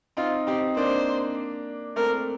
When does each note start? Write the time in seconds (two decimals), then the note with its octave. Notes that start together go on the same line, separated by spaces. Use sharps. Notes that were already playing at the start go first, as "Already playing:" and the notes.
0.17 C4 D#4 F4
0.47 C4 D#4 G4
0.77 A#3 D4 C5
1.96 A3 C4 A#4